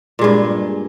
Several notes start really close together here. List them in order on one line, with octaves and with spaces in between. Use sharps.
A#2 G#3 G2